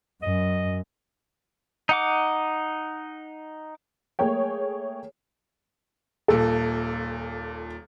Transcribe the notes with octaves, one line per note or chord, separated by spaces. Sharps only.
F#2 D#5
D#4 F#5 D6
A3 A#3 G#4 C#5 G5
D#1 A#2 A4